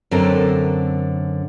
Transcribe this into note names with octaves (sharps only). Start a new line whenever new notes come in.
F#2 D3 C4 A4 A#4